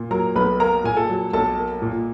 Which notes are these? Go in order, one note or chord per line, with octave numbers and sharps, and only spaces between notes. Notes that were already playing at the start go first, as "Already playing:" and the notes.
Already playing: A#2
F#3 A#4 A#5
B1 B4 B5
A#3 A#4 A#5
A#2 G#5
A4 A5
F#3
B1 A4 A5
A#3
A#2